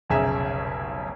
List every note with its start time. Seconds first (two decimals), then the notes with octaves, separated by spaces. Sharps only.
0.10 F1 B1 C#3 G#4 E5 A#5